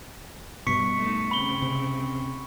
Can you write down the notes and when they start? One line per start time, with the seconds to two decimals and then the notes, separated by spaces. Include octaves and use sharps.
0.67 G2 B2 C#6 B6 C#7
0.97 A3 D#4
1.31 C#3 C4 B5 G7
1.62 C3